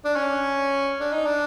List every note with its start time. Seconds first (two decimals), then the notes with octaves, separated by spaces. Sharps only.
0.05 D4
0.16 C#4
1.00 D4
1.13 D#4
1.26 D4